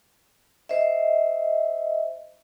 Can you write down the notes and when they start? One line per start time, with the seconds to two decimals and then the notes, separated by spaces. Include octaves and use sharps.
0.69 C5 D#5 E5